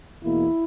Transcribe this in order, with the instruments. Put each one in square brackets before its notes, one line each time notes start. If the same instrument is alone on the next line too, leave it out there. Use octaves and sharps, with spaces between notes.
[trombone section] E2 B2 A#3 E4